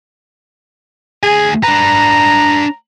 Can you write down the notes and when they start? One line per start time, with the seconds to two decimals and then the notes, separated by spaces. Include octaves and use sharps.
1.23 D2 G#4 G#5
1.64 D4 B4 A#5